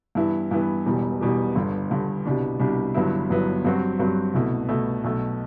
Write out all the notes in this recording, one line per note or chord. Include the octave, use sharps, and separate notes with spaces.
G2 E3 B3 E4
G2 E3 B3 E4
E1 E2 B2 G3
E1 E2 B2 G3
G1 G2 D3
G1 G2 D3
C2 B2 G3 D4
C2 B2 G3 D4
G1 G2 F#3 B3 E4
G1 G2 F#3 B3 E4
G2 F#3 C4 F#4
G2 F#3 C4 F#4
C2 B2 A3
C2 B2 A3
B1 B2 A3